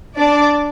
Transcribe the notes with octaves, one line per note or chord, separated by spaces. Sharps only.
D4 D5